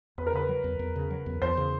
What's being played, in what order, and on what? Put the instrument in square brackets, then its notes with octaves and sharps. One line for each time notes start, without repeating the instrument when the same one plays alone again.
[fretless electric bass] E2 [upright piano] B4
[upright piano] A#4
[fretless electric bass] C#3 [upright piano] B4
[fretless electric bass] F#3
E2
E2
C#3
F#3
E2
[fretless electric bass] E2 [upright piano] C5
[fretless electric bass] C#3